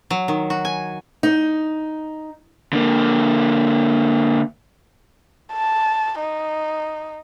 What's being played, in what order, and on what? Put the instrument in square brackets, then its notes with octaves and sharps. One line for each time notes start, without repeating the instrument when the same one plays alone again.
[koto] F#3
D#3
F#4
G#5
[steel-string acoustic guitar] D#4
[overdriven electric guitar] D3 A#3
[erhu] A5
D#4